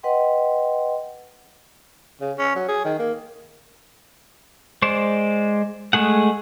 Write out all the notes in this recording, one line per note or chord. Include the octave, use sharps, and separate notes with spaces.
B4 D#5 F#5 G5 C6
C#3
C#4
F#3
G#4
D#3
A#3
G#3 C5 D5
G#3 A3 G#4 F#5